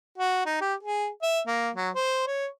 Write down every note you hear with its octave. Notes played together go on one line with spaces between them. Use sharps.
F#4
D#4
G4
G#4
E5
A#3
F#3
C5
C#5